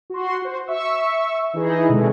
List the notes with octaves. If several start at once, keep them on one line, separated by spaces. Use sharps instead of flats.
F#4 C6
F#4 C5
E5 C#6 E6
E3 D#4 E4 G#4 D#5
B2 D3 G#3 A3 C4 F#4